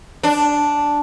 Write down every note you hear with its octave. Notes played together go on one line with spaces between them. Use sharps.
D4